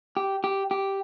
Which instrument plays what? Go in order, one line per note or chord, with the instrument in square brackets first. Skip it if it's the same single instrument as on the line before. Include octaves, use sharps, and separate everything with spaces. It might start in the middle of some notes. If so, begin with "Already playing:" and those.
[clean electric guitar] G4
G4
G4